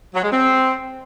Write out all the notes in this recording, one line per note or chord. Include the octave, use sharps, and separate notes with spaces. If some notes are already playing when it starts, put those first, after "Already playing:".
F#3
G#3
C4